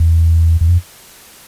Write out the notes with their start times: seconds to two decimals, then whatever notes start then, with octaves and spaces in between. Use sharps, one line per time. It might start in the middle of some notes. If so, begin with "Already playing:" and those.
Already playing: E2
0.61 E2
0.69 F2